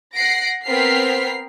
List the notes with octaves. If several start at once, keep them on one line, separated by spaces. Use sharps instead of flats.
F#5 A#6 C7 D7
B3 C4 A#4 F6 B6 C7